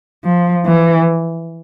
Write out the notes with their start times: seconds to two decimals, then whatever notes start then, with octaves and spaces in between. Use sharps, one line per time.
0.25 F3
0.66 E3